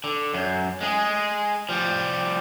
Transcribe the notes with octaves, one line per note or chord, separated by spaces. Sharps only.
D3
F#2
G#3 G#4
F3 G3